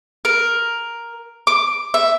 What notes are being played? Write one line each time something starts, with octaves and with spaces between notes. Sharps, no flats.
A#4
D6
E5